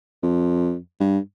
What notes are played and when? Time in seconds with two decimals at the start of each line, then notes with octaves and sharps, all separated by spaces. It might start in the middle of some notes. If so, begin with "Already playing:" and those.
0.23 F2
1.00 G2